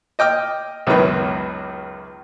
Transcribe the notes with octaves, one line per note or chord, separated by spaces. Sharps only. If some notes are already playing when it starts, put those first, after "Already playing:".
D#5 G5 D6 F6
C#2 F#2 B2 D#3 B4